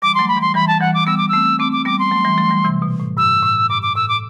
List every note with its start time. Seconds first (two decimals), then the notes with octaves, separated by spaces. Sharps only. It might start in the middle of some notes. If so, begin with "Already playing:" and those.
0.02 E3 G3 D6
0.15 F#3 A3 C6
0.28 B5
0.37 E3 G3
0.41 C6
0.54 E3 G3 B5
0.68 A5
0.80 E3 G3 F#5
0.94 D6
1.07 G3 B3 E6
1.18 D6
1.29 A3 C4 E6
1.59 A3 C4 D6
1.72 D6
1.85 G3 B3 D6
1.99 C6
2.11 F#3 A3
2.25 E3 G3
2.38 F#3 A3
2.51 E3 G3
2.64 C3 E3
2.82 B2
3.00 A2
3.17 G2 E6
3.42 A2
3.69 G2 D6
3.82 D6
3.95 A2 E6
4.09 D6